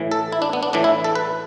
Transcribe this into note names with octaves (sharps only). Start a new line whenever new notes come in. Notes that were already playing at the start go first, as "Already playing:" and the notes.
Already playing: A2 E3
A4
E4
D4
B3
D4
A2 E3 D4
E4
A4
B4